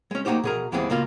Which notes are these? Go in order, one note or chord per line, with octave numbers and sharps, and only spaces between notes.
G#3 C#4
A#3 D#4 F#4 G4 C5
B2 G#4 A#4
D#2 E3 G3 B3 C4 G#4
C#2 B2 A#3 F4